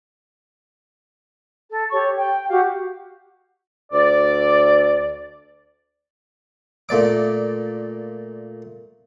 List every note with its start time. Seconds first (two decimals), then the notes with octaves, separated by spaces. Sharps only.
1.69 A4
1.91 G4 A4 C#5 C#6
2.17 G5
2.49 F#4 G4 F5
3.92 D2 D5
6.89 A#2 A3 D5 D6